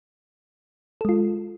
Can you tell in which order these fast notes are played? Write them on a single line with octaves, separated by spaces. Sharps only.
A4 G#3 F4